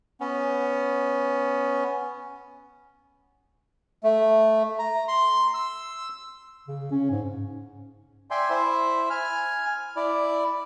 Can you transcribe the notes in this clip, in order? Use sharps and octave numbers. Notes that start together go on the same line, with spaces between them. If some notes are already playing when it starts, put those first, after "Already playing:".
B3 C#4
A3
A#5
C6
E6
C#3
C#4
G#2
D5 E5 G5 G#5 C6
E4 C5 E5
G#5 F6
E4 D5